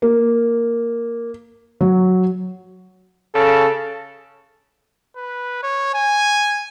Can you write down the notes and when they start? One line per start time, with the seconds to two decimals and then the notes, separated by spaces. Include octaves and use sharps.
0.02 A#3
1.81 F#3
3.35 C#3 A4
5.16 B4
5.63 C#5
5.94 G#5